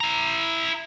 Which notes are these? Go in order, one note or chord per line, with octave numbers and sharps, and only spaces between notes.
E4 A#5